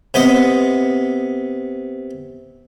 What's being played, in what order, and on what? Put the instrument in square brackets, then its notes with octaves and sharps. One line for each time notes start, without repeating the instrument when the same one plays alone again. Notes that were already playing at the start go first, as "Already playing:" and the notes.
[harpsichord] C3 B3 C5 D#5